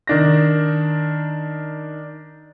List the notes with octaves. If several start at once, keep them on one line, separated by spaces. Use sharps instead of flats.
D#3 D4 A#6